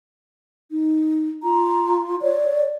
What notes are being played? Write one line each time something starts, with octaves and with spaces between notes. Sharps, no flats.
D#4
F4 A#5
C#5 D5